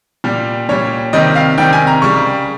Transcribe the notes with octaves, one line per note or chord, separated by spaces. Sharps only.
A#2 G3
A#2 G3 C#5
C3 D#3 G3 D#5
F5
C3 D#3 G3 G5
G#5
A#5
C#3 G3 C#6